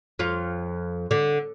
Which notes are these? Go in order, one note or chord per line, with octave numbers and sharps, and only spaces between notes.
F2 F4
D3